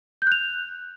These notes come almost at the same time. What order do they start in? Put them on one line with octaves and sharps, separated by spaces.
G6 F#6 F7